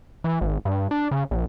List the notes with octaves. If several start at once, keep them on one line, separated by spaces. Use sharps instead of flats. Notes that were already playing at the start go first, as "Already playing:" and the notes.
E3
G#1
G2
D4
C#3
A#1